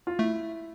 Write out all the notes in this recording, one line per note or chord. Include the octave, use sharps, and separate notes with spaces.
F4
A3 E4